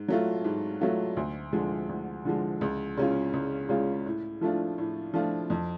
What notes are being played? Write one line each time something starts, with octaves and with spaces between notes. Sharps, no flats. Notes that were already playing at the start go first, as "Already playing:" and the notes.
Already playing: G#2
F#3 A3 F4
G#2
F#3 A3 F4
D2
D3 F3 G#3
D2
D3 F3 G#3
C#2
C#3 G#3 C#4 F4
C#2
C#3 G#3 C#4 F4
A2
F3 A3 D4 F4
A2
F3 A3 D4 F4
F2